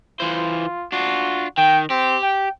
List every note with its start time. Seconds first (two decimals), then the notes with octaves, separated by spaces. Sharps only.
0.20 E3 F4 C5
0.92 D4 F4 F#4
1.58 D#3 G5
1.90 C4 G4
2.23 G5